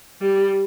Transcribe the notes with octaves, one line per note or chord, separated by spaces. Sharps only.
G3